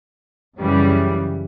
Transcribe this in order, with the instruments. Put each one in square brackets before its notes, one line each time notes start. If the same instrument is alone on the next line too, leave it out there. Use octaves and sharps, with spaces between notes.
[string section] F#2 C#3 E3 G3